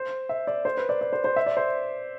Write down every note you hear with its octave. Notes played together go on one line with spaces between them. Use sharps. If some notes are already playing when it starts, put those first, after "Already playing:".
Already playing: C5
E5
D5
C5
B4
D5
D5
C5
C5
E5
D5
C5